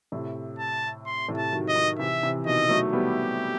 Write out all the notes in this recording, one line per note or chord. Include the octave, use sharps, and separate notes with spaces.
A2 C3
A5
C6
A2 C3
A5
D#3 F#3
D#5
D#3 F#3
C3 E3 E5
C3 E3
B2 D#3 D#5
F#3 A3
G3 B3 G4